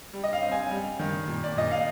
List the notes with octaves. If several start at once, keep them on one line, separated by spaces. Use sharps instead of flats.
G3
D#5
F5
C4
G#5
G3
D#3
A#2
D5
A#2 D#5
F5